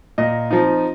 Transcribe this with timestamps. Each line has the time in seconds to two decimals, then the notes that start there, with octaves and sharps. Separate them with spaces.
0.18 A#2 D#5
0.51 F3 C4 D#4